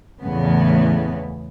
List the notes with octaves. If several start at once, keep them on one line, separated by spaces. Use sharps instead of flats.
E2 A2 C#3 B3